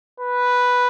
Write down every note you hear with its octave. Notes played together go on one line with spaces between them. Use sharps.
B4